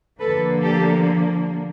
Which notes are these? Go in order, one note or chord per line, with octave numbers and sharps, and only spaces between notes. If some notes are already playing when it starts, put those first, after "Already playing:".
D3 F3 A#3 A4 B4
G4 A4